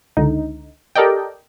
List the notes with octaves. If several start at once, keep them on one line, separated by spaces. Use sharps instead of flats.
C#2 D3 D#4
G4 A4 A#4 D5 D#5 G5